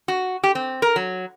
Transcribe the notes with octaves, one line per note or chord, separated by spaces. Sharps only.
F#4
G4
C4
A#4
F#3